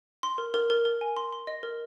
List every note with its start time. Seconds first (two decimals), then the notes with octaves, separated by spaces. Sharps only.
0.23 C6
0.38 A#4
0.54 A#4
0.70 A#4
0.85 A#4
1.01 G#5
1.17 C6
1.33 C6
1.47 D#5
1.63 A#4